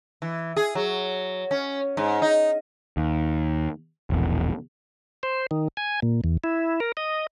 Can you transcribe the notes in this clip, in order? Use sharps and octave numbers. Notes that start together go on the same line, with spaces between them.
E3
G#4
F#3
C#4
G#2
D#4
D#2
E1 A#1 E2
C5
D#3
G#5
A#2
E2
E4
A#4
D#5